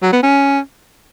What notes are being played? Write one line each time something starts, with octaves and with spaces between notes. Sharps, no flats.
F#3
B3
C#4